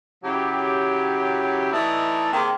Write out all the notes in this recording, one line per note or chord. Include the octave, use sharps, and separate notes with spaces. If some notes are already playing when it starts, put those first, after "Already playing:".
C#3 F#3 E4 G4
E3 A3 D#4 E4 D5 D#5
C3 D#3 G#3 A#3